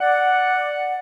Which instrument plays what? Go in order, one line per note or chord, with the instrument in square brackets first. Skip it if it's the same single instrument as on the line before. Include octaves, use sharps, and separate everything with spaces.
[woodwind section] D5 F#5